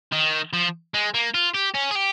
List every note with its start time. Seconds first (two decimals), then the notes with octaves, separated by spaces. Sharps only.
0.12 D#3
0.53 F3
0.94 G#3
1.14 A#3
1.34 F4
1.54 G4
1.75 C#4
1.91 G#4
1.95 G4